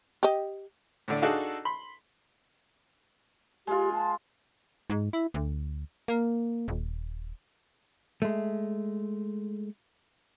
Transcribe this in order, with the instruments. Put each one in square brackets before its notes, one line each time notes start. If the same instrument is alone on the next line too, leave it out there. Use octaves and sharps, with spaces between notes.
[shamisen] G4 D#5
[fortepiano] A2 D3 D5
D4 D#4 F#4 G#4 A4 F5
B5 C6
[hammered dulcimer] G#3 F4 [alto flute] G4
[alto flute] A5
[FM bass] G#2
E4
D2
A#3
D#1
[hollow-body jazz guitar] G#3 A3